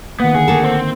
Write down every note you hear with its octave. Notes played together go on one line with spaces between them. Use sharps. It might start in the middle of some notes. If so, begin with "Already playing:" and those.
D#3 A#3 B3 F#5
D3 G#4
A3 A#3 A4
C4